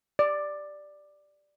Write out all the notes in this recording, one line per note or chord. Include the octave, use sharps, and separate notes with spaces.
D5